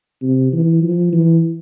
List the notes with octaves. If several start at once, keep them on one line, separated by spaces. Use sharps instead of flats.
C3
E3
F3
E3